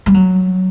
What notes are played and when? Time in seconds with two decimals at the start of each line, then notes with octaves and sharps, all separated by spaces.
0.06 G3
0.14 F#3